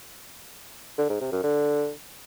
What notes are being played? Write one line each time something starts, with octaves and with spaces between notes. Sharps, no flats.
D3
G#2
C3
F#2
D3